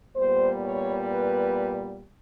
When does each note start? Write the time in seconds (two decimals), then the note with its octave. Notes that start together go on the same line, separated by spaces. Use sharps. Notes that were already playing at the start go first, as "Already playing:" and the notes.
0.16 A#2 G3 B3 C5
0.63 C#5
1.10 B4